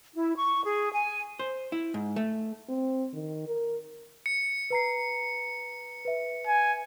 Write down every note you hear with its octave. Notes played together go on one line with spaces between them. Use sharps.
E4
C#6
G#4
G#5
C5
E4
G#2
A3
C4
D#3
A#4
C#7
B4 A#5 C7
B4 E5
G#5